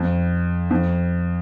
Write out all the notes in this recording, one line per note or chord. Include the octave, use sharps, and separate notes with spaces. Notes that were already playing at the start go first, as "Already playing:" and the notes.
Already playing: F2
F2